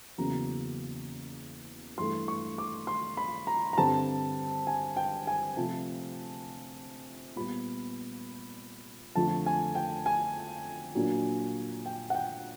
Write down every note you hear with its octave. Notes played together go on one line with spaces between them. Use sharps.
E2 C#3 F#3 A#3 C#4 A#5
G2 E3 A3 C6
C#6
D6
C6
B5
A#5
A#5
G2 D3 G3 C4 A5
G#5
G5
G#5
C3 F3 A3 A5
A#2 G3 B3 B5
F2 D3 F3 A3 A5
G#5
G5
G#5
A#2 F#3 A#3 D4
G5
F#5
G5